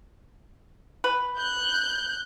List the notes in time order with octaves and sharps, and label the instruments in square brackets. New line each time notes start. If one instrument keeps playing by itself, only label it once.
[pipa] B4
[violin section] F#6 G6